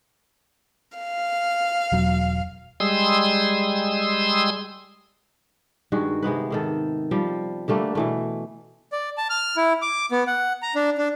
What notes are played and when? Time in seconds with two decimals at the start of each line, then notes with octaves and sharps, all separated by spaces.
0.98 F5
1.92 E1 F#3
2.80 G3 G#3 C6 D#6 E6
5.92 G2 D#3 G#3 F#4
6.22 C3 G#3 B3 B4
6.50 G#2 D#3 A4
7.11 F3 G3
7.68 D3 G3 A3 A#3
7.95 B2 E3 A3
8.92 D5
9.18 A5
9.30 F6
9.57 E4
9.82 D6
10.11 B3
10.27 F#5
10.62 A#5
10.75 D4
10.98 D4